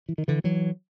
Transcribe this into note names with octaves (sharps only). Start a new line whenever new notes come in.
E3
D#3
D3 E3
E3 F#3